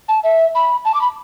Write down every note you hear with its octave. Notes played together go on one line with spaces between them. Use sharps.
A5
E5
B5
A5
D6
B5